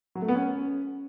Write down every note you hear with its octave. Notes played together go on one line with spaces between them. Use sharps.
F#3
A3
B3
C#4